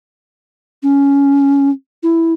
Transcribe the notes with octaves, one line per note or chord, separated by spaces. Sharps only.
C#4
E4